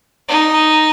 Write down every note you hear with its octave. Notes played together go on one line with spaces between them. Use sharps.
D#4